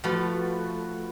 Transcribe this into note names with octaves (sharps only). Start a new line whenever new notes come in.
F3 A3 F#4 B4